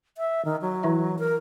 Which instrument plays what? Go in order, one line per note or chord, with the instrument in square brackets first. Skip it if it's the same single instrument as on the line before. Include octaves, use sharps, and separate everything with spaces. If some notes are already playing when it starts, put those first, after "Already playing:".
[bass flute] E5
D#3
F#3
[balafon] E3 E4 E5
[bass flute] A#4